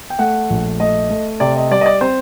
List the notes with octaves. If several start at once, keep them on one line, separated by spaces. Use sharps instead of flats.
G5
A3 F#5
A#1
A3 D#5
A3
C3 D5
D#5
G3 D5
D#5
D5
C4 C5